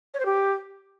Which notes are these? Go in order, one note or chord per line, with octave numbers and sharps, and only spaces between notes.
C#5
C5
G4